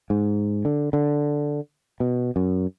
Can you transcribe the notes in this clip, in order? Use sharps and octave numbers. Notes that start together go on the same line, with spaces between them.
G#2
D3
D3
B2
F#2